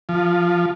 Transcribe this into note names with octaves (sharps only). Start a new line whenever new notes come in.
F3